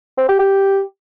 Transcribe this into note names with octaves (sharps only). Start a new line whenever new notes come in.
C4
G4
G4